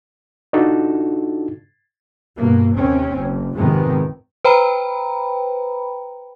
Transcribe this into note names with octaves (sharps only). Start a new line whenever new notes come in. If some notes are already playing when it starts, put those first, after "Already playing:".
D4 D#4 F4 F#4 A4
G2 B2 A#3
D#2 C3 C4 C#4
F#1
G#1 F2 C3 D#3 G#3 B3
B4 C5 G5 A#5 B5